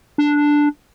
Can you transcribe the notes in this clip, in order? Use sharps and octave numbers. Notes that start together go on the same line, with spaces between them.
D4